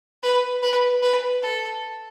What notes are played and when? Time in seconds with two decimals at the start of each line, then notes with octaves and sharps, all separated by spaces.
0.23 B4
0.62 B4
1.02 B4
1.42 A4